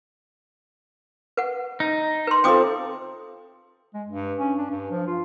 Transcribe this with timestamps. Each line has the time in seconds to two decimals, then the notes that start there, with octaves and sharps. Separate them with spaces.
1.37 B4 F#5
1.80 D#4
2.27 B4 C6
2.44 C4 F4 A4 G5 D6 D#6
3.94 G#3
4.07 G2
4.39 C#4
4.58 D4
4.70 G2
4.91 F3
5.07 F4